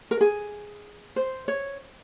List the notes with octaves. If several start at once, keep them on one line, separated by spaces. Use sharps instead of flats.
A#4
G#4
C5
C#5